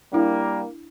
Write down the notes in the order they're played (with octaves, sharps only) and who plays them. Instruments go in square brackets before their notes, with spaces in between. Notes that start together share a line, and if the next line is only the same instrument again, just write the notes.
[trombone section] G3 A#3 [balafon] D4 E4